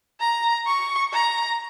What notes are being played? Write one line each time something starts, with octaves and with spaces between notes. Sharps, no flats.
A#5
C#6
A#5